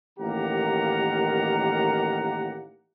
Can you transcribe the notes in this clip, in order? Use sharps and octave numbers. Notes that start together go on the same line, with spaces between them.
A1 D#3 A#3 G4 F#5 A#5